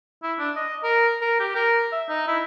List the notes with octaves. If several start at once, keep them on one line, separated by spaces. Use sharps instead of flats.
E4
D4
D#5
A#4
A#4
G4
A#4
E5
D#4
E4